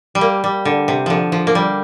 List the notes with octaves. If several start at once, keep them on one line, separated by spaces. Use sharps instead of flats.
G3
A#3
G3
D3
C3
D3 F3
F3
A#3
G3